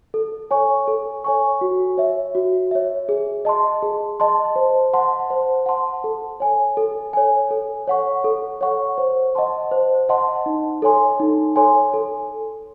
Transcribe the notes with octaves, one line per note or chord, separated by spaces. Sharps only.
A4
C#5 G#5 C#6
A4
C#5 G#5 C#6
F#4
C#5 E5
F#4
C#5 E5
G#4
D#5 A5 C6
G#4
D#5 A5 C6
C5
F#5 A5 C6
C5
F#5 A5 C6
A4
C#5 G#5
A4
C#5 G#5
A4
C#5 F#5 C#6
A4
C#5 F#5 C#6
C5
D#5 F#5 A5 C6
C5
D#5 F#5 A5 C6
D#4
A4 C#5 G#5 C6
D#4
A4 C#5 G#5 C6
A4